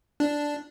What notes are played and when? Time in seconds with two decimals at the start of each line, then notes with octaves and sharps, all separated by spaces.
0.20 D4